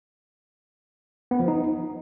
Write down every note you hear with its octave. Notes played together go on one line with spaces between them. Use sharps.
B3
F3
D#4